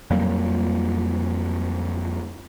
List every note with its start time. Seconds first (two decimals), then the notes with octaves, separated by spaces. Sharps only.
0.10 F2 F#3 G3 A#3